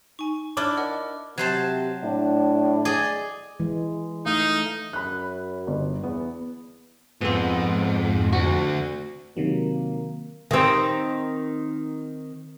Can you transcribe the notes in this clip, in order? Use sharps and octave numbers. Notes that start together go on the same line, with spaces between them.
D#4 G#5 C#6
D4 E4 D5 D6 F6
A#4 D#5 F#5
C3 F#3 C5 A5
A2 D4
G#4 D5 D#5
E3 G#3
A3 D#4 F5
F#2 B5 F#6
G1
E2 B3
F2 G#2 B3 C4
D2 F#4
C3 D#3 F#3 A#3
D#3 C4